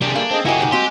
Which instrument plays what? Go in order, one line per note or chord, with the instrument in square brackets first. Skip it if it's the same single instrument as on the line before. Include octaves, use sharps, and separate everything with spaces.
[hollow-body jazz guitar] C2 [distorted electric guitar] C3 D4 [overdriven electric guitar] G3 G#4
[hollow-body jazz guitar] A3 A#3 [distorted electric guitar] D4
[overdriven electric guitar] C4 [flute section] G#4 D#5 A5
[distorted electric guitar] C#3 A#3 [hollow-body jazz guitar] E4 D#5 [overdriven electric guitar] F#4 G4 [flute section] G#5
[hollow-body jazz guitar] G#2 D#3
[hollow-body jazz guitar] C4 F#4 [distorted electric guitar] G4 [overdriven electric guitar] D#5 C6